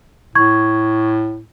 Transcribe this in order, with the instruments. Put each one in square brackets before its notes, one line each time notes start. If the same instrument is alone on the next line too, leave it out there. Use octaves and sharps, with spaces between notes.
[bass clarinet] A2 [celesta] C#6 G#6